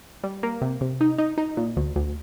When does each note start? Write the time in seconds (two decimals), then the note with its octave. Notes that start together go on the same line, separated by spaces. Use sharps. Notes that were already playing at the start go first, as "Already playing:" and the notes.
0.24 G3
0.43 A#3
0.62 C3
0.81 C3
1.01 D#4
1.18 D#4
1.38 D#4
1.57 A#2
1.77 D2
1.96 D2